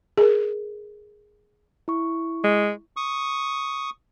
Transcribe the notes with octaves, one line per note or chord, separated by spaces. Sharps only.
G#4 A#4
E4 C#6
G#3
C#6 D#6